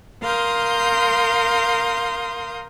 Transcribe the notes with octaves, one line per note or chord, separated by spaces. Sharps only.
A#4 F5 C6 D#6 G6